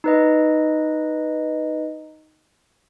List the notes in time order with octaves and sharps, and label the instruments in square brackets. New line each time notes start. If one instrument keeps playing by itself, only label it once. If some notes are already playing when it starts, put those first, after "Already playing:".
[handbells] D#4 B4 D#5